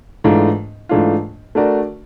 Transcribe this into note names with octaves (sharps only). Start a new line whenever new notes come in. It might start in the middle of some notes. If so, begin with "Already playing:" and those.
G#2 E3 A3 D4 F4
G#2 E3 A3 D4 F4
A3 D4 F#4 A#4 D5